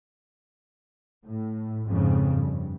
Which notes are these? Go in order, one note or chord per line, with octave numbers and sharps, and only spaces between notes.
A2
F2 G#2 C#3
G2